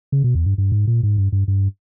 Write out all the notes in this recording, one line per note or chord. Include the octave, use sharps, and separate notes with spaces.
C#3
B2
E2
G2
G2
G#2
A#2
G#2
G2
G2
G2